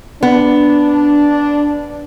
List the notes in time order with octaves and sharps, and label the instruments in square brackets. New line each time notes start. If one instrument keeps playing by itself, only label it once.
[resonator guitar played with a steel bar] B3 [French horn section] D4